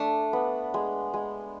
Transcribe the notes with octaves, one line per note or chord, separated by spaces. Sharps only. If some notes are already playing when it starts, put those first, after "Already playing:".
Already playing: A3 D4
B3
G#3
G#3